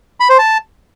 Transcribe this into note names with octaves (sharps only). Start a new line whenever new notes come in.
B5
C5
A5